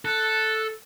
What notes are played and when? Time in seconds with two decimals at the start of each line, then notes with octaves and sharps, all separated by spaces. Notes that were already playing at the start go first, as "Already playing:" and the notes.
0.05 A4 F#6